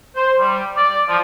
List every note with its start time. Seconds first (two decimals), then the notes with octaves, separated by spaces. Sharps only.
0.16 C5
0.39 G3
0.76 D5
1.09 F3